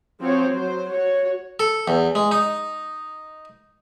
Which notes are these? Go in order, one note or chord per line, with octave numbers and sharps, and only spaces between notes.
F3 C4 F#4 C5 C#5
F#3 C5
F#4 C#5
A4
E2
G#3
D#4